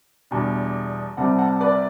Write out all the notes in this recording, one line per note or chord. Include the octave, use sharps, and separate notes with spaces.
E2 B2 G3 D4
C2 C3 G3 C4 F#5 A5
F#5 A5
B4 D5